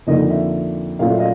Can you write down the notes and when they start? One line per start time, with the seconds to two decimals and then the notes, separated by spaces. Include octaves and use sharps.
0.07 F2 D3 F3 A#3 D#4 D#5
0.30 E5
0.99 A#2 F#3 A3 C#4 F4 F5
1.10 E5
1.19 D#5 F5